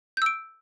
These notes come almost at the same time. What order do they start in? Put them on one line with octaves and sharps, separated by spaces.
G6 E6 D7